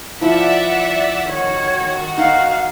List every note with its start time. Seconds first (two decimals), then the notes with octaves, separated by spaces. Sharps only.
0.21 F3 E4 D5 E5 F#5
1.32 D#3 F#4 C#5
2.18 D#4 F5 F#5